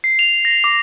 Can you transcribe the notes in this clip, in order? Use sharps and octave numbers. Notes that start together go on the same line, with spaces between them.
C7
F7
A#6
D6